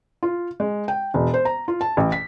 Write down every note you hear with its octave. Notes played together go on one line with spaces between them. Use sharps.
F4
G#3
G5
E1
C5
A#5
F4
A5
A1
B6